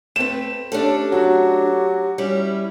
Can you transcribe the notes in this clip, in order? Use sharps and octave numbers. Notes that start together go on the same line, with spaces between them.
A3 C4 B4 E7
A3 C#4 D4 G4 A4
F#3 F#4
G3 C#4 E4